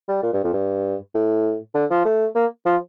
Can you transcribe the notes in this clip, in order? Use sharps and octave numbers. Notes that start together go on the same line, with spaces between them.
G3
A#2
G2
F2
G2
A2
D3
F3
A3
A#3
F3